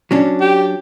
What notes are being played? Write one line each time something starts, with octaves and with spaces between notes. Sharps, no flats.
F#3 C#4 D4
G4